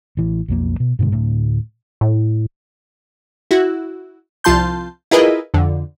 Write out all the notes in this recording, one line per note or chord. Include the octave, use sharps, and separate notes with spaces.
A1 E3
B1 F2 A#3
B2
G2 B2 D3 G#3
D2 A2
A2
E4 F#4
C2 F3 F4 A5 C6 G6
E4 F4 G#4 A#4 B4 D#5
F2 D3